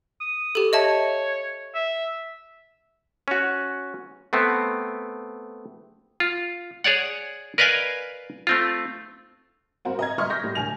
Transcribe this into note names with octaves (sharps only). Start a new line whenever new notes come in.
D#6
G4 A4
C#5 D#5 E5 A5
E5
C#4 F#4
A3 B3 C4
F4
G#4 C#5 D5 F#5
A#4 B4 D5 D#5 F5 G#5
A3 C4 F4
C4 F#4 A#4 C5
D#5 A#5 G#6
D#5 E5 C6 C#6 D#6 F6
G6 A#6 B6
A2 G3
D2 G#5 F7